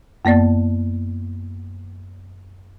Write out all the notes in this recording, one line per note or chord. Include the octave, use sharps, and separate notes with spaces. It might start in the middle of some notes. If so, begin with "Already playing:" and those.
F#2 A#3 B3 D5 A6